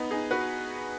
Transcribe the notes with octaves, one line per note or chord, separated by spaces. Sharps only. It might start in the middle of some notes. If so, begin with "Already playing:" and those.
Already playing: B3 D#4
D#4 G#4
F#4 B4